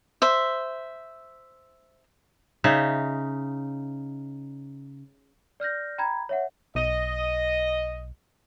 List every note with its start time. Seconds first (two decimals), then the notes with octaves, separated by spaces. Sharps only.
0.22 C5 E5
2.64 C#3 D#4 E5
5.60 D5 F6 G6 A#6
5.98 G5 A#5 B5 G#6
6.29 C#5 E5 F#5
6.75 B1 D#5